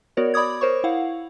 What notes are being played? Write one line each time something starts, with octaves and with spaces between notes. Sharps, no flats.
B3 F#4 A#4 C#5 D5
D5 B5 D6 D#6 G#6
A#4 C5 C#5 C#6
E4 F5 F#5